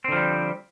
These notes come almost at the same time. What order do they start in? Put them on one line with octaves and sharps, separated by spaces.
C4 D3 F3 G3